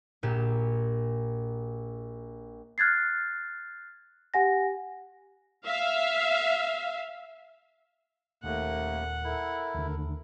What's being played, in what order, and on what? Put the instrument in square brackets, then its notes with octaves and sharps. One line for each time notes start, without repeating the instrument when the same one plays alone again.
[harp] A#1 A#2 G4 E7
[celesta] F6 F#6 G#6 A6 C7
G4 F#5 G#5 A#6
[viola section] E5 F5
[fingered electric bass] D#1 [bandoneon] D#2 [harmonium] A3 A#3 [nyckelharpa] F#5
[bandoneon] E4 [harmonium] A4 A#4
[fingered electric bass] D#2 D3